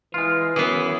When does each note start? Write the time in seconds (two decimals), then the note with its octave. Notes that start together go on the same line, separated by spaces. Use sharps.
0.14 E3 G#3 F4
0.56 F#2 E3 B3 G#4